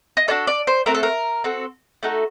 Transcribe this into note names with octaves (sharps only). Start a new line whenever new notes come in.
D#5
D4 F#4 A4 D5
D5
C5
A3 C4 F#4 A#4
A4
A#4
C4 F#4 A4
A3 D#4 F#4 A4